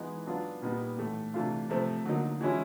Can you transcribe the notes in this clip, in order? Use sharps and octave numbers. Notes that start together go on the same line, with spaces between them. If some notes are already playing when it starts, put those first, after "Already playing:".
Already playing: E3 G#3 B3 D#4
F#3 B3 D4 F4
A#2 G3 B3 D#4
A2 E3 A3
C3 E3 A3 D4 F4
C3 F3 A3 C4
D3 F#3 A#3 D#4
E3 G#3 C#4 E4